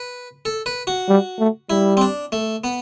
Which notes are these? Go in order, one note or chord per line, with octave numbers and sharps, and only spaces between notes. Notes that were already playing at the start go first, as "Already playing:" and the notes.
Already playing: B4
A4
B4
F#4
G3
A3
G3 E4
C4
D4
A3
B3